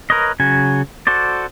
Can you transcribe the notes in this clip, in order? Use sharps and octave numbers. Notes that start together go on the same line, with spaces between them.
A#4 B4 C#5 D#5
C#3 F#3 F#4 G#5
F#4 A4 C5 D5